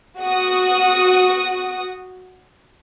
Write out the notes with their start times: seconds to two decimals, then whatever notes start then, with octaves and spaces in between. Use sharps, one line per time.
0.20 F#4 D#6